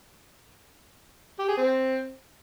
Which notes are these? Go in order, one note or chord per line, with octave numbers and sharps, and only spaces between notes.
G4
G#4
C4